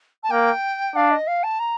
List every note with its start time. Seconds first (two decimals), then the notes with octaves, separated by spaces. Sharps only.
0.23 A5
0.30 A#3 G5
0.95 D4 F5
1.11 D#5
1.27 F5
1.43 A5
1.59 A#5